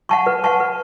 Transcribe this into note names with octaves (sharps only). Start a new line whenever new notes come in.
F#5 A5 C#6
B4
F#5 A5 C#6
B4